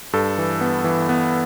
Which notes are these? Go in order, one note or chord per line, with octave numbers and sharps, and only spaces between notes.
G2 A4
E3
B3
E3
B3